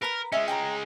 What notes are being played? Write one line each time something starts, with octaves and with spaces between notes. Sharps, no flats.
A#4 B4 A#5 B5
G#3 C#4 D#5 E5 G#5
G5 G#5 A#5